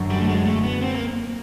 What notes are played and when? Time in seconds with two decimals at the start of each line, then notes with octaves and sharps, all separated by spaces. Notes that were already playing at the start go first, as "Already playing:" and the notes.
Already playing: F#2 D3 F#3
0.11 G3
0.20 A3
0.28 G#3
0.46 A3
0.64 B3
0.82 C4
0.95 A#3